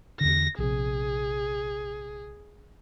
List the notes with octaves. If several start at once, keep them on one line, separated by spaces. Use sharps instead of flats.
E2 D3 A#6
A#1 C3 G#4